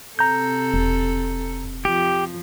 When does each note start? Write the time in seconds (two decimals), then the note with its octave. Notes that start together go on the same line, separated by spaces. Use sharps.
0.19 C3 C4 A4 A#5 G6
0.74 E1
1.85 F2 F3 G4